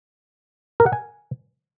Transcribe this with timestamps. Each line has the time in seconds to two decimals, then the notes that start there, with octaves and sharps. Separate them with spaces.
0.80 A#4
0.86 F#5
0.93 G#5